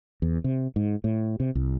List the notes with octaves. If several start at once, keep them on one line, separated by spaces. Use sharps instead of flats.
E2
C3
G#2
A2
C3
C2